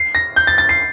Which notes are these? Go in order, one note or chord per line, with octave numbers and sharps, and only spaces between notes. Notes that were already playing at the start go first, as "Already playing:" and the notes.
Already playing: C7
A#6
G6
A6
A6
C7